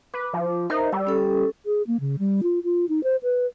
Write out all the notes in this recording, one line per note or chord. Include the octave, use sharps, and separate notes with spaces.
B4 D6
F3
D#4 A#4 C5 E5
G3 E6
C#4 A4
G#4
A#3
C#3
G3
F4
F4
D#4
C5
B4